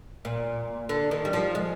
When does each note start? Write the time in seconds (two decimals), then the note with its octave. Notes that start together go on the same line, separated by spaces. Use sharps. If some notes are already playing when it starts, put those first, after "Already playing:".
0.25 A#2
0.89 D3
1.11 D#3
1.25 G3
1.33 F3
1.55 G#3